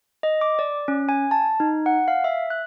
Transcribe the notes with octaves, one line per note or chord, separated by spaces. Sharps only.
D#5
D6
D5
C#4
G#5
A5
D#4
F#5
F5
E5
F#6